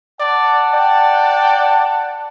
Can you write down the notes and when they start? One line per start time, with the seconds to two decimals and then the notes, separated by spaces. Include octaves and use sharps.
0.20 D5 F#5 A5
0.74 D5 G5